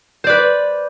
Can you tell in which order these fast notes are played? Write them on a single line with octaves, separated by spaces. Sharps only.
C5 D5 B4